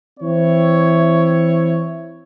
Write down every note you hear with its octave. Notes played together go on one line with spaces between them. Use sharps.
E3 C4 E4 C#5